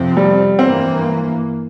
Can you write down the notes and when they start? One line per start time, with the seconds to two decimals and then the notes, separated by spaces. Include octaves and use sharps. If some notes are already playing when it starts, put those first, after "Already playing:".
Already playing: F2 C3 F3 C4
0.17 G3
0.59 G2 E3 A#3 C4